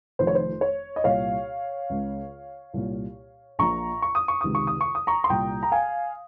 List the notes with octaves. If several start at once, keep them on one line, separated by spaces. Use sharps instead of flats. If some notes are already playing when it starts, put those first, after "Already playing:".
F1 F2 D#3 C5
C#5
C5
C#5
D#5
C2 A#2 C#5 F5
C#2 C#3
C2 A#2
A#1 A#2 A#5 C#6
C#6
D#6
C#6
C#2 C3 D#3 D#6
C#6
D#6
C#6
D#6
A#5 C#6
C6
C2 A#2 G5 A#5
A#5
F5 G#5